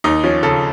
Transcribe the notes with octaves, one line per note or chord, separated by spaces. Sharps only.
D#2 D#4
F3 C#4
C#3 A4